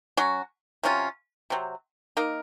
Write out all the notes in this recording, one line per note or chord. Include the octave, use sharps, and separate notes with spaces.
F#3 C#4 F#4
C3 F#3 C#4 F4
C3 F#3 C4
A#3 D#4 A#4